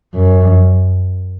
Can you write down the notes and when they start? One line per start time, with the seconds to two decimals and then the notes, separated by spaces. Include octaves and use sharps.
0.15 F#2